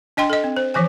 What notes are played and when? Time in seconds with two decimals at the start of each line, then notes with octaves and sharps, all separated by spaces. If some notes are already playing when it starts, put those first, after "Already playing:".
0.17 D4 D#5 G5 C6
0.30 A4 D#5
0.44 C4
0.57 C5
0.74 E3 F3 C5 G#5